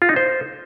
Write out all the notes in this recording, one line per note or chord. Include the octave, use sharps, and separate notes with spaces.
F4
D#4
C5